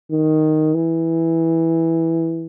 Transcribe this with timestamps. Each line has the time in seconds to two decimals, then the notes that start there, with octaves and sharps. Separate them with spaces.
0.11 D#3
0.74 E3